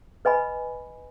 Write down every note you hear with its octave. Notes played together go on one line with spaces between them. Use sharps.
B4 D#5 G#5 B5